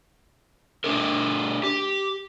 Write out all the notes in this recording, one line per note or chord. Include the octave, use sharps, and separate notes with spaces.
A3 D4 A4 A#4
G4